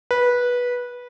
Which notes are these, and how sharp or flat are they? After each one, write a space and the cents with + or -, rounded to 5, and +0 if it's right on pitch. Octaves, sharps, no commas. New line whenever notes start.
B4 -15